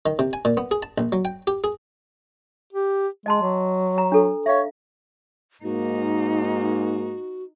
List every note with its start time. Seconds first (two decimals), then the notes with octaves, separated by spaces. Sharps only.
0.06 D#3
0.19 C3
0.33 G#5
0.45 A#2
0.57 B3
0.71 G#4
0.83 A5
0.98 A#1
1.12 F#3
1.25 G5
1.47 G4
1.64 G#4
2.73 G4
3.26 G#3 D#5 A5 C6
3.42 F#3
3.98 A#5
4.12 D4 A4
4.46 C#5 E5 F5
5.64 G#2 A#3 D#4 F#4